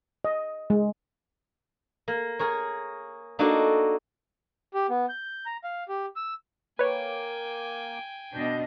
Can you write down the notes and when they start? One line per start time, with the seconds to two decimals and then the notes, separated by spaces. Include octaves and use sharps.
0.24 D#5
0.70 G#3
2.08 A#3
2.39 G#4 A#4 C#5
3.39 A#3 D4 D#4 F#4 A4
4.74 G4
4.90 B3
5.09 G6
5.46 A#5
5.64 F5
5.89 G4
6.16 E6
6.79 A#3 B4 C#5 G5 G#5
8.35 B2 D4 D#5 G6